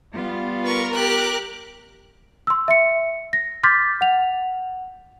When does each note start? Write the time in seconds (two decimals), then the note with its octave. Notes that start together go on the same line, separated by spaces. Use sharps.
0.15 G3 B3 F4
0.64 A#4 B4 C#6
0.94 G4 F#6
2.47 C6 E6
2.68 E5 C6 C#7
3.33 A#6
3.63 C6 D6 F6 G6 A6 B6
4.01 F#5 F7